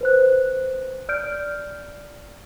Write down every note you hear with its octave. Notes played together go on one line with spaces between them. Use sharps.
B4 C5 F#6
D5 F6 G6 D7